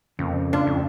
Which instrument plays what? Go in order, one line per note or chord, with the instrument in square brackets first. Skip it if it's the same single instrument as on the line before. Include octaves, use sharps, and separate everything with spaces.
[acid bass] F2 [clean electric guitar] C#3 A#3
[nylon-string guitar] D4 [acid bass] F4
[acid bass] F2